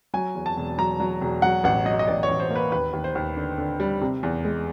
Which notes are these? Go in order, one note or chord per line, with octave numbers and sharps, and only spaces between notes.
F#3 G#5
E2
A5
E1
F#3 A#5
F#3
E1
F#3 F#5
A1 F#5
F#3 D#5
D#5
A1 D5
C#5
A1
C5
A#3
B4
D#2 B4
D#2
C5
D#2
D3
D3
G3
C3
E2
G#3